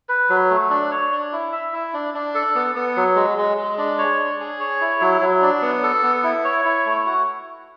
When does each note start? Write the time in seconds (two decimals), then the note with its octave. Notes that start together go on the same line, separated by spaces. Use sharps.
0.09 B4
0.29 F#3
0.50 A3
0.70 D4
0.91 C#5
1.12 D4
1.33 E4
1.52 E5
1.73 E4
1.94 D4
2.14 D4
2.35 A4
2.55 B3
2.75 B3
2.97 F#3
3.16 G#3
3.38 G#3
3.57 G#3
3.78 D4
3.98 C#5
4.19 D4
4.40 G#4
4.60 C#5
4.81 E4
5.01 F#3
5.21 F#3
5.42 D4
5.62 B3
5.83 A4
6.03 B3
6.24 E4
6.45 C#5
6.65 E4
6.86 A3
7.06 F#4